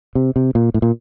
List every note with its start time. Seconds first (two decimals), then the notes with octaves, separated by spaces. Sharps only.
0.15 C3
0.36 C3
0.55 A#2
0.74 A2
0.82 A#2